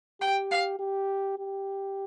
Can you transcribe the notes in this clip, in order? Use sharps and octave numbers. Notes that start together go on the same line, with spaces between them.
G4 G5
F5
G4
G4